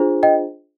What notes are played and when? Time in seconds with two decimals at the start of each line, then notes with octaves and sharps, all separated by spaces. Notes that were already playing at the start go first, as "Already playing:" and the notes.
Already playing: D4 F4 G#4 C5
0.23 D#5 G5